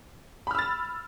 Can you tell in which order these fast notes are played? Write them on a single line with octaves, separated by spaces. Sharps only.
B5 F6 E6 A6